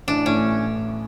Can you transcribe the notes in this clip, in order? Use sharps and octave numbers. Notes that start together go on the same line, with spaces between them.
A1 D4
A2 C#4